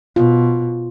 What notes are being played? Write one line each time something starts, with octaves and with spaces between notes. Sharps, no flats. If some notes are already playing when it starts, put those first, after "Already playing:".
B2 F4